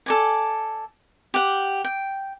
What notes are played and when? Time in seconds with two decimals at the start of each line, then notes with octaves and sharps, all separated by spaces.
0.06 A4 D5 G#5
1.34 G4 F#5
1.84 G5